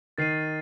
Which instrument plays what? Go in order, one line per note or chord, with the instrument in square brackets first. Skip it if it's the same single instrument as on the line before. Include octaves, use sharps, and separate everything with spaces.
[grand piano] D#3 [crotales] A6 C7 D#7